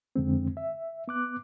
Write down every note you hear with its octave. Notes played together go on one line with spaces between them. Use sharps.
F2 D3 G#3 C4
E5
B3 D6 F#6